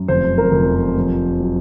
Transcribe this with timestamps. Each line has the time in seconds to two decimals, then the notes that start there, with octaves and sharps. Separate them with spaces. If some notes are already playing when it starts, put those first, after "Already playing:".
Already playing: F#2
0.08 F1 C5
0.38 A#4
0.52 F1
0.96 A#1
1.40 F#3